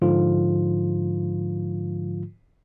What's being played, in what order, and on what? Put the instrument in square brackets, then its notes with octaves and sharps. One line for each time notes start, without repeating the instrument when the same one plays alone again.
[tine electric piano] G#2 D3 F3 F4